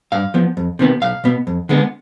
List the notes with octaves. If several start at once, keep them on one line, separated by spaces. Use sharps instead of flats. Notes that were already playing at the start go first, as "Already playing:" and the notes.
G2 F5
F3 B3
F2
C3 D#3 B3
B1 F5
B2 B3
F2
D3 G#3 B3